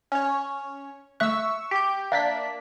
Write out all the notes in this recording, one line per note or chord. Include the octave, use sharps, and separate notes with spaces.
C#4 C#5
A3 E5 C#6 E6 F#6
G4 G6
A#3 D4 E5 B6